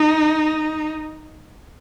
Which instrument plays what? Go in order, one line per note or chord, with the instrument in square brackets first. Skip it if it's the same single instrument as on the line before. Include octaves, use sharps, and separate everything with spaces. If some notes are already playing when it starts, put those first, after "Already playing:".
Already playing: [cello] D#4